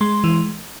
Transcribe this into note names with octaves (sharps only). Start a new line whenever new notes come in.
G#3 C6
E3